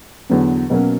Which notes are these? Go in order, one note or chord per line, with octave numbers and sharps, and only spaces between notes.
E2 D3 F#3 B3
B2 F#3 A#3 C#4